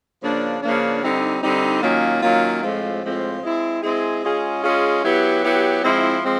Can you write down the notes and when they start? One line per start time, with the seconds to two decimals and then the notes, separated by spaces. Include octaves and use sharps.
0.22 C#3 F3 A#3 D4
0.63 C#3 F3 A#3 D4
1.02 D3 G3 C4 D#4
1.43 D3 G3 C4 D#4
1.82 D#3 F#3 A#3 C#4 F4
2.23 D#3 F#3 A#3 C#4 F4
2.63 A2 F3 G#3 C4 F4
3.03 A2 F3 G#3 C4 F4
3.43 G#3 C4 E4 G#4
3.83 G#3 C4 E4 G#4
4.24 G#3 C#4 F4 G#4
4.64 G#3 C#4 F4 G#4
5.03 F#3 B3 E4 G4
5.44 F#3 B3 E4 G4
5.84 F3 G#3 C4 E4
6.24 F3 G#3 C4